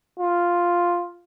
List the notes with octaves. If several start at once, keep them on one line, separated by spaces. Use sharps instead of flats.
F4